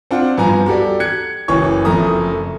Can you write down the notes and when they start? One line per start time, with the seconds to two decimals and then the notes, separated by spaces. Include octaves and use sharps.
0.11 C4 D4 F4 F#5
0.38 G2 F3 B3 G#5 A#5
0.66 F#4 G4 A4 D5
1.00 F#6 G#6 C#7
1.48 F#1 E3 C#5 C#6
1.85 F#1 F2 A3 A#5 D#6